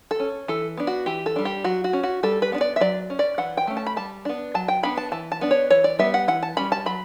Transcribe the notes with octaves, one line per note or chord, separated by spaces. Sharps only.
A4
C#4
E3 A4
B3 D4
F#4
E3 G4
A4
G3 D4
G4
F#3 F#4
F#4
C#4
F#4
G3 A4
B4
B3 D4
D5
E5
F#3 D5
C#4
D5
E3 F#5
G5
A3 C#4
A5
B5
G3 A5
B3 D4
F#3 A5
G5
B3 D4 B5
A5
E3 A5
A5
B3 D4
C#5
E3 C#5
D5
G3 B3 E5
F#5
E3 F#5
A5
G3 C#4 B5
A5
F#3 B5